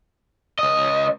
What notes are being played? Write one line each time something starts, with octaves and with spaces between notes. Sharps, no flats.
C#2 D#5